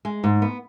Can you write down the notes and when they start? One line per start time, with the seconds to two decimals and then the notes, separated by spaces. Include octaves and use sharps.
0.05 G#3
0.24 G#2
0.42 B3